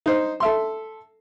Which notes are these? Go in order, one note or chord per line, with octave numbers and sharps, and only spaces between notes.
D#4 C5
A4 E5 C6